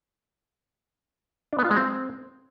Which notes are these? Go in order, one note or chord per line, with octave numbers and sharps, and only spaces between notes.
D4
B3
F4
G#3
C4